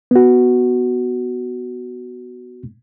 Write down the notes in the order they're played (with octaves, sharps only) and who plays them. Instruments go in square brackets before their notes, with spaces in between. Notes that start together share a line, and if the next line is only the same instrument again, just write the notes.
[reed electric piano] B3 F#4